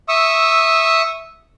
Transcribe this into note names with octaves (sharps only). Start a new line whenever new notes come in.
E5 C#6 D#6 E6